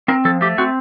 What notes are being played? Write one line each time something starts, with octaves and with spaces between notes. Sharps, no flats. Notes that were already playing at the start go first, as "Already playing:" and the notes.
C4 A#4
F3 A4
A3 G4
C4 F#4